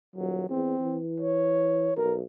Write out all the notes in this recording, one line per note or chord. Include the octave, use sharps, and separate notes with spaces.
D#1 F#3
E2 C4
E3
C#5
B1 A#4